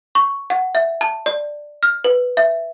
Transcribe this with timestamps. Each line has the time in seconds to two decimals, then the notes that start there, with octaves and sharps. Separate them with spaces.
0.15 C#6
0.50 F#5
0.75 E5
1.01 A5
1.26 D5
1.83 F6
2.04 B4
2.37 E5